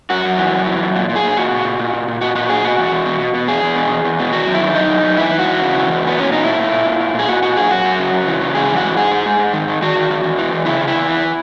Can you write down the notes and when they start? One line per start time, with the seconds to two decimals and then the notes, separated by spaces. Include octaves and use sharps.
0.10 F#2 F#4
0.25 F#2
0.38 E3
0.53 F#2
0.66 E3
0.81 F#2
0.96 A#2
1.09 A#2
1.15 G#4
1.23 A#2
1.37 A#2 F#4
1.51 A#2
1.65 A#2
1.79 A#2
1.94 A#2
2.08 A#2
2.21 A#2 F#4
2.35 A#2 F#4
2.49 A#2 G#4
2.64 B2 F#4
2.79 E2
2.92 E2
3.05 B2
3.20 B2
3.34 B2
3.48 E2 G#4
3.63 E2
3.76 B2
3.90 E2
4.05 E2
4.19 B2
4.32 D#3 F#4
4.47 F#2
4.54 E4
4.61 D#3
4.74 F#2 D#4
4.89 F#2
5.03 F#2
5.17 E3 E4
5.31 E3
5.39 F#4
5.45 E2
5.60 C#3
5.74 E3
5.87 E2
6.02 A#2
6.07 B3
6.16 A#2 C#4
6.30 A#2 D#4
6.44 A#2 E4
6.59 A#2
6.72 A#2
6.86 A#2
7.00 A#2
7.14 A#2 G#4
7.28 A#2 F#4
7.42 A#2 F#4
7.56 A#2 G#4
7.71 F#2 F#4
7.84 F#2
7.99 C#3
8.13 C#3
8.27 E3
8.41 C#3
8.55 G#2 G#4
8.69 E3
8.77 F#4
8.83 G#2
8.97 G#2 G#4
9.11 G#2
9.26 G#2
9.39 G#2
9.53 D#3
9.68 D#3
9.82 D#3 F#4
9.96 D#3
10.11 D#3
10.23 E2
10.38 E3
10.52 E2
10.66 C#3 E4
10.81 C#3
10.88 E4
10.95 E2
11.08 E3